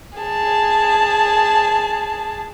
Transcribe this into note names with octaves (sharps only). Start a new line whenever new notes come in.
G#4 A5